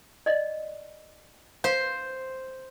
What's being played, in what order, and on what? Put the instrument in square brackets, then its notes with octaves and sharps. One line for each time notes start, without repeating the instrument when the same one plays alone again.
[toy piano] D5 D#5
[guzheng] C5 [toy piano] F5